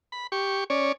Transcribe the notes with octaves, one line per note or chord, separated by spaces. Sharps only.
B5
G4 C#6
C#4 C#5 D5